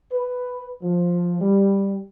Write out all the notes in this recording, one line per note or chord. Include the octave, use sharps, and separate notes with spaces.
B4
F3
G3